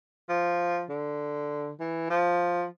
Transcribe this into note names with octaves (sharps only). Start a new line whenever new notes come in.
F3
D3
E3
F3